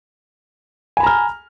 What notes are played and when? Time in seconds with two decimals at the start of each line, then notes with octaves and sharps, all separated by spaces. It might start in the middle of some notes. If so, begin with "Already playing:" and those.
0.97 G#5
1.00 B5
1.03 A#5
1.06 F6